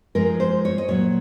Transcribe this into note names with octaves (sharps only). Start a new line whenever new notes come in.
G#2 F3 G#3 A#4
C5
C#5
D#5
A#2 F#3 C#5